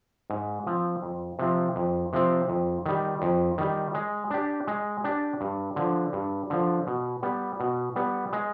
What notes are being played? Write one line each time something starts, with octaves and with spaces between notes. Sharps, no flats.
G#2
F3 C4
F2
C3 F3 C4
F2
C3 F3 C4
F2
D#3 G3
F2
D#3 G3
G#3
D4 G4
G#3
D4 G4
G2
D3 F3
G2
D3 F3
B2
G3 B3
B2
G3 B3
G#3